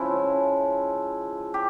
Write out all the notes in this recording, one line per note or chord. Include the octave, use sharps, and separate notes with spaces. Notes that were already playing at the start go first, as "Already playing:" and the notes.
Already playing: C#3 F3 G#3 E4
G4